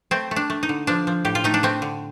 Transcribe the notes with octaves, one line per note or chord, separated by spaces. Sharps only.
A3 C4
A3
D4
A3
D#4
D3
F3 D4
F3
A2 G4
F4
A3 D#4
D4
A3 C4
D3